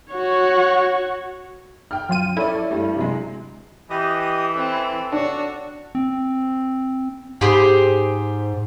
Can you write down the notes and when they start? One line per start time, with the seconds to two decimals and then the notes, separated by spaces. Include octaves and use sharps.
0.13 F#4 C#5
1.91 G5 F6
2.09 F#2 F4 D#7
2.37 E4 A4 C#5 D5
2.70 G2 G3 A3
2.97 C3 F#3 G#3
3.90 E3 G4 D#5 D#6
4.55 C4 A4
5.12 D4 F#4 C#5
5.95 C4
7.41 G#2 G4 G#4 C5